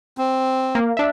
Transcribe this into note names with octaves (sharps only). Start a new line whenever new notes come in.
C4
A#3
D4 E5